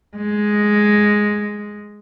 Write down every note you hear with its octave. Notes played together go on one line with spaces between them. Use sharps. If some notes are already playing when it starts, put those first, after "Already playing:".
G#3